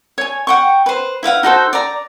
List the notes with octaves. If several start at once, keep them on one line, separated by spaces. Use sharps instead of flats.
C#5 G#5
F#5 G5 C#6
B4 C5
E4 B4 F5 F#5
D#4 F#4 A4 C5
D5 A#5